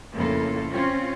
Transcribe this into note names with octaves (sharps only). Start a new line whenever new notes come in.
F2 A2 C#3 A#3 F4 A4
C4 C#4 F4